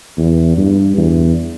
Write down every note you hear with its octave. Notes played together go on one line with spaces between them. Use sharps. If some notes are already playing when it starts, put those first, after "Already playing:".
E2
G2
E2